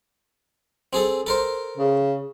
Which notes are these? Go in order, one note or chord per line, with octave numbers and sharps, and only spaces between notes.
C4 G#4 A4
A4 A#4 C5
C#3